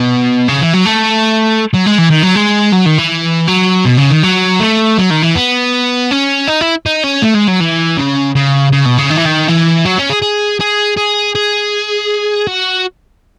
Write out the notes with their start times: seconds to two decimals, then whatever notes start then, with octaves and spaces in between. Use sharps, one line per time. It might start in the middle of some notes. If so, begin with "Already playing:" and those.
Already playing: B2
0.48 C#3
0.61 E3
0.73 F#3
0.85 A3
1.74 F#3
1.86 G#3
1.98 E3
2.10 D#3
2.23 F#3
2.36 G#3
2.73 F#3
2.86 D#3
2.98 E3
3.48 F#3
3.86 B2
3.98 C#3
4.11 D#3
4.23 F#3
4.60 A3
4.98 F#3
5.11 D#3
5.23 E3
5.36 B3
6.11 C#4
6.47 D#4
6.61 E4
6.86 D#4
7.04 C#4
7.22 A3
7.35 G#3
7.48 F#3
7.60 E3
7.97 C#3
8.35 C#3
8.72 C#3
8.86 B2
8.98 C#3
9.11 D#3
9.17 E3
9.26 D#3
9.48 E3
9.85 F#3
9.98 C#4
10.10 G#4
10.22 G#4
10.61 G#4
10.97 G#4
11.35 G#4
12.47 F#4